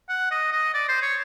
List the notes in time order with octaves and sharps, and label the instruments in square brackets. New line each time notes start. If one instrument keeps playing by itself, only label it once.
[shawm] F#5
D#5
D#5
D5
C5
C#5